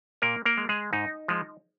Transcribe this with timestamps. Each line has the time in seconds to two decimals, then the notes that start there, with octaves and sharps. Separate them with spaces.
0.22 A#2 A#3 A#4
0.46 A#3 A#4
0.58 G#3
0.69 G#3 G#4
0.93 G#2 D#4
1.28 F3 G#3